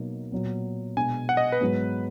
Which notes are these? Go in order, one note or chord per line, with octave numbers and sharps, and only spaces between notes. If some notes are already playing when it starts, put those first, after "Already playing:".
Already playing: B2 F#3 A#3 D#4
A#2 F#3 B3
B2 G#3 D4 G#5
F#5
D#5
B4
G#2 F#3 B3